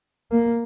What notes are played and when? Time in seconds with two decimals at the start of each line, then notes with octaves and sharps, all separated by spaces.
0.31 A#3